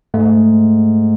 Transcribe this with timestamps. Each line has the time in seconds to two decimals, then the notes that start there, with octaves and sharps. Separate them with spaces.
0.14 G#2 A3